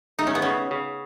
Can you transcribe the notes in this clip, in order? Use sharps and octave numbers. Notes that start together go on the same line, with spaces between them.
A3 D#4
C#4
B3
C#3 C#4
C#3